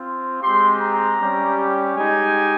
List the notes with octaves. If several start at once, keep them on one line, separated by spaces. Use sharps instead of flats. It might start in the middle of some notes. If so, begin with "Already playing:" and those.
Already playing: C4 F4
G#3 C4 G4 C6
A#5
G3 C#4 G4
G#3 D#4 G4 G#5